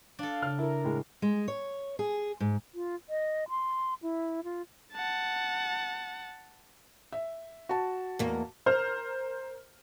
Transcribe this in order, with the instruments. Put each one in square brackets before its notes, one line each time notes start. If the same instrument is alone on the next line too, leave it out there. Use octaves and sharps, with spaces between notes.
[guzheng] D4 A4 [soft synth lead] F5
[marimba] C#3 [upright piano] F6
[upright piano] E4 [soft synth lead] A#4
[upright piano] A2 G#3
[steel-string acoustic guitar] G#3
C#5
G#4
G#2
[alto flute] F4
D#5
C6
E4
F4
[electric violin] F#5 A5
[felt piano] E5
F#4 A5
[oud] E2 A#3
[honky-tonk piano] A#4 C5 F6